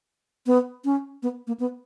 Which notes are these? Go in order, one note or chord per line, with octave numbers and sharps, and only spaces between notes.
B3
C#4
B3
A#3
B3